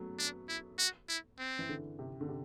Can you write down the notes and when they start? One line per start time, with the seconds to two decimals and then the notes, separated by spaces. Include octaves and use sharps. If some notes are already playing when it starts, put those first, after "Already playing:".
Already playing: F#3 A3 B3
0.19 D4
0.49 E4
0.79 F#4
1.09 E4
1.39 C4
1.59 E3
1.69 D3
1.99 C3
2.21 D3
2.29 C3